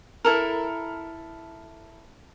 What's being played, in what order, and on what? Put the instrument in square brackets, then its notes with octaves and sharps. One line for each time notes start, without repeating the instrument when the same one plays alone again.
[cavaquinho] E4 A4 A#4